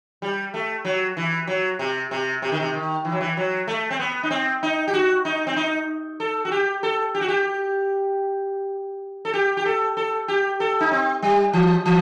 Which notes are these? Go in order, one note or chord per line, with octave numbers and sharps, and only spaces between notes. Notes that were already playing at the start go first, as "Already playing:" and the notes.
G3
A3
F#3
E3
F#3
C3
C3
C3
D#3
C3
D#3
E3
F#3
E3
F#3
A3
C4
B3
D#4
C4
D#4
G4
F#4
D#4
C4
D#4
A4
F#4
G4
A4
G4
F#4
G4
A4
G4
G4
A4
A4
G4
A4
D#4
C4
G3
E3
E3